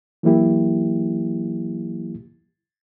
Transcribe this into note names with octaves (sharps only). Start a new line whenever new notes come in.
E3 F#3 A#3 E4 G4